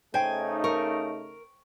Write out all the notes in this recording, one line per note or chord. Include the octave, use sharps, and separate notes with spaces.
C#3 A3 D#4 C5 G5 G#5
A#4 C#6